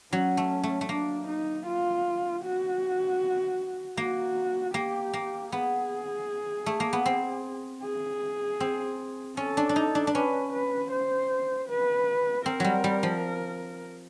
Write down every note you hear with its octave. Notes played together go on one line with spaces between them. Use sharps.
F#3 C#4
A3
A3
A3
A#3 D4
D#4
F4
F#4
A#3 F#4
A#3 G4
A#3
B3 G#4
A3
A#3
B3
C4
G#4
C4
C#4 A4
D4
D4
D#4
D4
D4
C#4 B4
B4
C5
B4
C4 A#4
F#3 G3
G3
F3